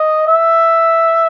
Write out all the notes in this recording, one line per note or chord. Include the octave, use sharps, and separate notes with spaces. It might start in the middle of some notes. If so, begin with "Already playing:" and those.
Already playing: D#5
E5